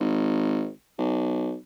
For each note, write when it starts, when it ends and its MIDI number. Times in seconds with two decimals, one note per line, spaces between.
0.01 0.69 32
0.98 1.55 35